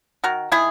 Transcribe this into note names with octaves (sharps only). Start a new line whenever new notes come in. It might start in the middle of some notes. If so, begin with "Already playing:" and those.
D#3 F#4 A#4
D#3 E4 G#4